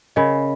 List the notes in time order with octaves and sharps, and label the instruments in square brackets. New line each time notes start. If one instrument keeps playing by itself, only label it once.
[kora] C#3 [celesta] A#4 D#5 G#5 B5